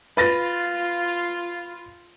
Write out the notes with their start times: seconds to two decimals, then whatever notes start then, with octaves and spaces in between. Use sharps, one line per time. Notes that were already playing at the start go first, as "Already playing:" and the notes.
0.17 F4 B4 A6 A#6